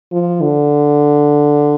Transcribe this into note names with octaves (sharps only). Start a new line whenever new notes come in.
F3
D3